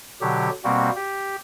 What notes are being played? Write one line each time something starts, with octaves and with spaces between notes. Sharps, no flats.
B2 D3 F#3 G4
B2 G3 A#3 C4 F#4
G4